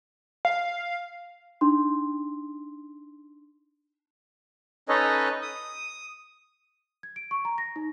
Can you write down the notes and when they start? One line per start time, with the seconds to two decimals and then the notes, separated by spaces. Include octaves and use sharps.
0.45 F5
1.61 D4 D#4 C6
4.89 C#4 D#4 A4 B4 C#5 D#5
5.42 D#6
7.03 G#6
7.16 D7
7.31 C#6
7.45 A#5
7.58 A#6
7.76 D#4